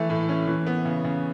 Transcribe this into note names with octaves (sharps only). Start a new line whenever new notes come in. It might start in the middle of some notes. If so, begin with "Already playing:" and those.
Already playing: E3 A3
A2
C#4
E3
B3
C#3
C#3